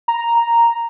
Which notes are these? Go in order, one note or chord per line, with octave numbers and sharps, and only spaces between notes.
A#5